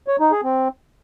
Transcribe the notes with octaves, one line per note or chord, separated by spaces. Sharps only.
C#5
D#4
G#4
C4